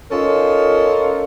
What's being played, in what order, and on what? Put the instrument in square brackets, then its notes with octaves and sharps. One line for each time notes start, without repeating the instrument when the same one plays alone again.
[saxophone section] C#4 D#4 F4 A4 A#4